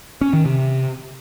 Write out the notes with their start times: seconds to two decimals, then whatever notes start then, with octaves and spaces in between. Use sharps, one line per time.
0.21 C#4
0.33 D#3
0.45 C3